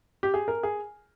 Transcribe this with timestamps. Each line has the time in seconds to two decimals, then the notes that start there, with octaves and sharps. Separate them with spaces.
0.23 G4
0.34 G#4
0.48 A#4
0.63 G#4